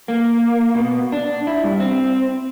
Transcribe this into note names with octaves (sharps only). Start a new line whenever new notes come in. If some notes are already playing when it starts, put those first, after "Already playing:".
A#3
B2
D4
E4
G2
C4